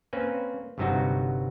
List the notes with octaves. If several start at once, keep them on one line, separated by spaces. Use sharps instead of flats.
A#3 C4 C#4 B4
G1 G2 C3 F#3 D#4 F#4